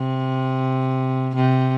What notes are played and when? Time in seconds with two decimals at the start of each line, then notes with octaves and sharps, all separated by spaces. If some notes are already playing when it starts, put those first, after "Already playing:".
Already playing: C3
1.35 C3